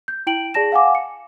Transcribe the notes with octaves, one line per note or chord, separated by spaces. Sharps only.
G6
E4 G5 D7 F#7
G#4 D5 A5 A#6 E7
F5 F#5 G#5 D6
C#7